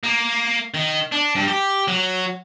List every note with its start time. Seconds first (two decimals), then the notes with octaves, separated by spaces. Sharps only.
0.03 A#3
0.74 D#3
1.12 D4
1.35 G2
1.48 G4
1.88 F#3